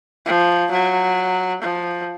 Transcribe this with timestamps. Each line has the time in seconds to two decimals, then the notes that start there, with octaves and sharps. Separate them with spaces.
0.26 F3
0.71 F#3
1.62 F3